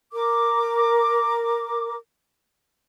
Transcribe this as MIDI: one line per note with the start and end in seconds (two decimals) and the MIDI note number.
0.12 1.95 70
0.12 1.95 86